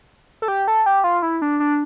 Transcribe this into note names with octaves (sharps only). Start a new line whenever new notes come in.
A4
G4
A4
G4
F4
E4
D4
D4